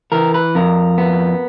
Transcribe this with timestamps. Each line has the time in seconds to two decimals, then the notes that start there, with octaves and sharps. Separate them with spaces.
0.12 E3 A#4
0.34 B4
0.55 F2 A#4
0.98 B3